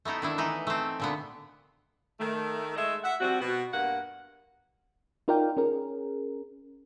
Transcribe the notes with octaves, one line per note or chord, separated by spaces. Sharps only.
A3 B3 D#4 E4
D#3 D4 E4
E3 D#4 B4
A3 C4
A#2 D3 B3
D#3 A3
G#3 A3 A4 D#5 E5
E5 F#5
F3 G3 C4 F#4
B2 F#4
G2 A#3 F#5
D#4 F4 A#4 D5 F5 G5
C#4 G#4 A#4